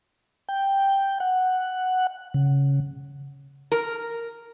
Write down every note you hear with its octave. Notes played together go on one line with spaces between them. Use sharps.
G5
F#5
C#3
A#4